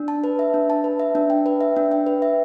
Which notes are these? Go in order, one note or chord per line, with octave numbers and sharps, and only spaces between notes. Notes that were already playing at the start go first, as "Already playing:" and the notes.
Already playing: D4
A5
B4
E5
D4
A5
B4
E5
D4
G5
B4
E5
D4
G5
B4
E5